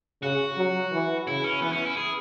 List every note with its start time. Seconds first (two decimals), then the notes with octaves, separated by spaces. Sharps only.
0.22 C#3 F#4
0.57 F#3
0.92 E3
1.27 C#3 E4
1.44 C#4
1.61 E3 B3
1.73 C#4
1.85 E4
1.97 G#4